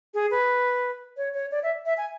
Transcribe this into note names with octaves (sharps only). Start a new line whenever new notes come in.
G#4
B4
C#5
C#5
D5
E5
E5
G#5